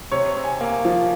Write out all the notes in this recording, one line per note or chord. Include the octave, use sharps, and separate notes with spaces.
C3 C#5
C3
G#5
A#3
F3